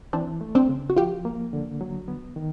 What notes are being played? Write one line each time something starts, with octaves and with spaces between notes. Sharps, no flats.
E3 C4 D4
A3
C4 D4
C#3
F#4
F3 F4 G4
A#3
D3
F#3
B3
D#3